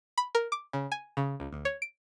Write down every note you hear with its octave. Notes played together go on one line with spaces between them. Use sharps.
B5
A#4
D6
C#3
G#5
C#3
C#2
D2
C#5
D7